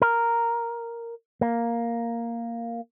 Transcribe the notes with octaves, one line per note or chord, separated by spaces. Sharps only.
A#4
A#3